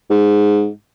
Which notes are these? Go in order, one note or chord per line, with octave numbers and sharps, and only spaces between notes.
G#2